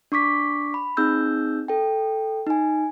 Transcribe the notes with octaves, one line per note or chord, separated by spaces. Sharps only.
D4 C#6 D6 B6
B5
C4 D#4 G#4 E6 G6
A4 G5
D#4 G#5